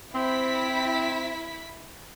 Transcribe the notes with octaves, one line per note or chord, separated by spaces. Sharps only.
C4 E4 B6